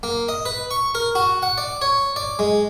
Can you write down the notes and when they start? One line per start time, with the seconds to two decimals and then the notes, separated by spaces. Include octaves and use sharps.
0.03 A#3
0.29 D#5
0.45 B4
0.71 C#6
0.95 A#4
1.15 F#4
1.42 F#5
1.58 D5
1.81 C#5
2.16 D5
2.39 G#3